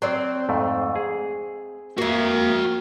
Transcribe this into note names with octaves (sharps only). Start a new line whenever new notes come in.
F#3 C4 D5
F2 G#2 A3
G#4
F2 A#3 F#4 E5